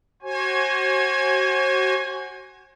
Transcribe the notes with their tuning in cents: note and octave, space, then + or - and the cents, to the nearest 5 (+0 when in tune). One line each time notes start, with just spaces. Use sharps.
F#4 +25 C5 +45 G#5 +0